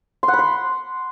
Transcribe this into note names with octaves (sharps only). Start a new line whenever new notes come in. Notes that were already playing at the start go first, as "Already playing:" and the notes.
C6
F#5
B5
C6